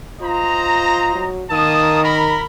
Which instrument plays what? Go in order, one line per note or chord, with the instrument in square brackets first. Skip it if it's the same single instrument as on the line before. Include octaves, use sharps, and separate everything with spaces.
[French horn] F4 [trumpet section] C5 D#5 A#5
[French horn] F#3
[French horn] D#3 [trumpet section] A#3 A5 D#6
[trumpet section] A#4 A#5 B5